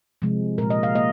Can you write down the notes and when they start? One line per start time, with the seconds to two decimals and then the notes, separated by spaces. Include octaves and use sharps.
0.22 C3 F3 G#3
0.58 A#2 G#3 A#4
0.70 D#5
0.83 F5
0.95 A#3 D#5